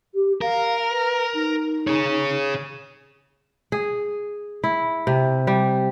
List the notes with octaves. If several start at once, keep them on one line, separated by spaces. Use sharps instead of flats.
G4
A#4 F5
B4
D#4
G#4 C#5
G#4
E4
C3
G3